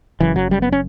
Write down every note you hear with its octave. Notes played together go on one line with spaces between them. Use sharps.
F#1 F#2 C#3 E3
F#3
G3
B3
C#4